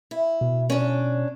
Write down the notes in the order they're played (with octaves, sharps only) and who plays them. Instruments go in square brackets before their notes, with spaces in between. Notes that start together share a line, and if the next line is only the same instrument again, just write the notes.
[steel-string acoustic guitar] E4
[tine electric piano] B2
[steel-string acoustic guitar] C#4 D4